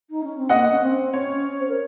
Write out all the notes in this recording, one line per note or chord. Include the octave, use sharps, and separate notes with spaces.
D#4
C#4
C4
A#3 D#5 F#5
C#4
C4
C#4 C#5
C5
A#4